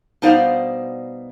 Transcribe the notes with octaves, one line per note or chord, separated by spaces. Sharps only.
B2 G3 D#4 C5 D5 F5